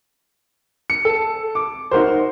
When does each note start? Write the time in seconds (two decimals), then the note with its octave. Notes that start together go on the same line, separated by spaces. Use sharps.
0.90 C#7
1.05 A4
1.55 D6
1.91 D#4 F#4 A#4 C5